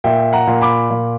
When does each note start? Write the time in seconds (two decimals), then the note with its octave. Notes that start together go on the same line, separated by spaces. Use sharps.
0.04 A#2 E5 G5
0.33 F#5 A#5
0.47 A#2
0.61 B5 D6
0.90 A#2